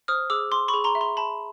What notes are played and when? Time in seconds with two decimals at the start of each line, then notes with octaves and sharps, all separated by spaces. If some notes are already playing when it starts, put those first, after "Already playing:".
0.08 C5 D#6 F6
0.30 G#4 D6 E6
0.52 G#4 C6 D6
0.68 B5 C#6
0.74 G#4
0.84 A#5 C6
0.95 E5
1.01 A#5 C6
1.17 E5 A5 B5